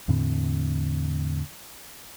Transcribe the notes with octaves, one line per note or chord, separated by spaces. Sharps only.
E2 A2 D3 C4